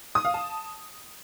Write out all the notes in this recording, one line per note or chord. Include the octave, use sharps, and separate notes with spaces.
D#6
F5
A5